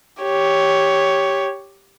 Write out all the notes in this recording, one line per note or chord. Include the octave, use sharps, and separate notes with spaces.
G4 C#5